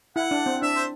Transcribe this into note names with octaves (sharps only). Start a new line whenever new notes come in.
E4 F#5
D4
C4
D4 E5
C5